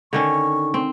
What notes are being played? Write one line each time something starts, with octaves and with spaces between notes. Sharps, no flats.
D3 D#3 C#4 C#6
C4